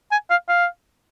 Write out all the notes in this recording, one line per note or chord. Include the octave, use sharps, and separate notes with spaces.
G#5
F5
F5